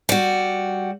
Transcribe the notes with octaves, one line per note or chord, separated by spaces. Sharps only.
G3 F#4